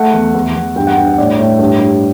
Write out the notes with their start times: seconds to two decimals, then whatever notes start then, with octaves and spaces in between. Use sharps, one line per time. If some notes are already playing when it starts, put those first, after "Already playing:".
Already playing: A3 F#5
0.13 E2
0.34 E2
0.55 E2
0.76 G2 G5
0.87 F#5
0.97 G2 G5
1.07 F#5
1.18 A2 D5
1.39 A2
1.59 G2
1.81 G2